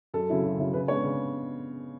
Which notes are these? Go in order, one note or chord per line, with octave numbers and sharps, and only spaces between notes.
F#2 A4
C#3 F#3 C#4 E4
F#2
C#3 F#3 C#4 E4
C#3 B4
G#3 B3 D4 C#5
C#3